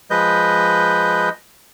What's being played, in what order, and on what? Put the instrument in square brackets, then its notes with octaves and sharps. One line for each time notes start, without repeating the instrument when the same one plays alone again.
[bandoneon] F3 G#3 B4 D#5 G6